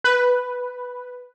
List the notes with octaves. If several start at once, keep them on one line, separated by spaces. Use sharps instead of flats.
B4